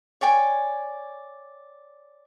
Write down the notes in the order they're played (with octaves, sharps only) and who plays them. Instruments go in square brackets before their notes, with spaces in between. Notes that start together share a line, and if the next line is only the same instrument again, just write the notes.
[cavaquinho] C#5 D5 G5 G#5